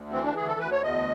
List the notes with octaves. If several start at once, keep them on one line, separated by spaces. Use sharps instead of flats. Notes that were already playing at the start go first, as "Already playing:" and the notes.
Already playing: D2
E3 C4
D4
D2 G#4
A4
D2 B4
C#5
E2 D#5